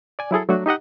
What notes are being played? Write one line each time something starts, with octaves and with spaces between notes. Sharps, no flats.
D5 G#5
F#3 E4 G#4 A4
F#3 A3 D4 F#4
D#4 G4 D#5 F#5